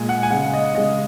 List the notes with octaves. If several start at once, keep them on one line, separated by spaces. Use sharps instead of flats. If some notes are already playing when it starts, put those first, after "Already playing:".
Already playing: A#2 G#3 G#5
F#5
G#5
C#3 G#3 F#5
D#5
C#3 G#3 D#5